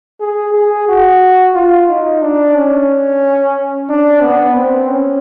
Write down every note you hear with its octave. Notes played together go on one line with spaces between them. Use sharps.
G#4
G#4
F#4
F4
D#4
D4
C#4
D4
B3
C4
C#4